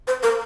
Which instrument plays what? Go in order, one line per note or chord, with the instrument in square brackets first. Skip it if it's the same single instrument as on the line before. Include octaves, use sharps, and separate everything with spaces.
[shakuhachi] C5
A#4